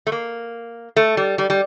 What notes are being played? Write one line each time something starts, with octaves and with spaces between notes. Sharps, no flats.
A3
A#3
A3
G3
G3
G3